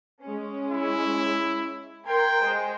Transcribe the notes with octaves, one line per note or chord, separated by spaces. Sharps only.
G#3 C#4
E4
A#4 G5 C6 G#6
G#3 G#4 C5